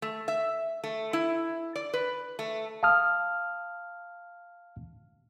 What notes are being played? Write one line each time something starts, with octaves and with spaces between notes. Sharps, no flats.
A3
E5
A3
E4
D5
B4
A3
F5 A5 D#6 F6